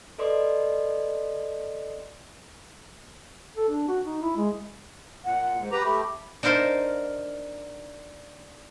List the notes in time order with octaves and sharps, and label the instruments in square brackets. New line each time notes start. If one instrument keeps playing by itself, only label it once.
[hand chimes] A4 B4 D5 D#5 C6 D6
[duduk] A4
D4
F#4
D#4
E4
G#3
[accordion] A#2 [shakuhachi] F#5
[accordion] G#2
[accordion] G4 B4 A#5 [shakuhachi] D6
[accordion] A3 G4 [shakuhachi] B5
[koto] D4 D#4 A#4 C5 F5